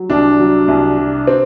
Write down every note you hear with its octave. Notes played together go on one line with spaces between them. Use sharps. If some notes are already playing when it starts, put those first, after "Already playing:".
Already playing: F#3
C2 D4
F#3
C2
C3
C4